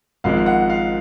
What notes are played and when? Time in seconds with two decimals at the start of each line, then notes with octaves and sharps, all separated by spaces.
0.24 G#1 G#2 F3 G#3 F5
0.37 F5
0.46 F#5
0.70 F5